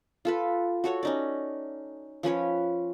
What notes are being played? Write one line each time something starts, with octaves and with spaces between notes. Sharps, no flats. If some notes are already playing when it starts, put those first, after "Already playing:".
F4 A4 B4
F#4 A4 C#5 F#5
C#4 D#4 D5
F3 C#4 B4 C#5